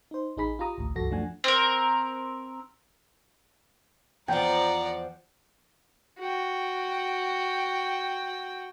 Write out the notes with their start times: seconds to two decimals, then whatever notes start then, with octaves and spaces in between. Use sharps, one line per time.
0.11 D#4 C5
0.37 A1 D#4 G#4 B5 B6
0.59 F4 G4 A#5 D#6
0.78 A1 D2 A2
0.95 C#2 G2 F3 F#4 A4 A#6
1.11 F#2 F3 A3 D4 F#5 G#5
1.44 C4 A#4
4.28 E2 F3 D5 F#5 G5 A#5
6.19 F#4 G5